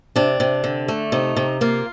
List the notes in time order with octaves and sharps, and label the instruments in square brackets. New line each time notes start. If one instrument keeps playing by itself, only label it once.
[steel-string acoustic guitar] C3 D4
C3
D3
A3
C3 D#4
C3
A#3 F4